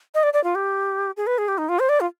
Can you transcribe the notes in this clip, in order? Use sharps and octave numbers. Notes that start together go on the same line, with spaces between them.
D#5
D5
D5
F4
G4
G#4
B4
G#4
G4
D#4
F4
C5
D5
F4